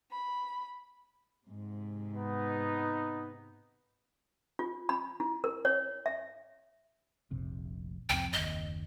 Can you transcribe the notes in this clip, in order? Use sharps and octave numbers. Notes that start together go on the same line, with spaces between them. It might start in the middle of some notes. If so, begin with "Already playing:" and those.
B5
G#2 C3
B3 D#4
F4
B5
E4
A#4
C#5
E5
F1 A#1 C3
C2 F2 C4 G5
F#1 D#2 D#5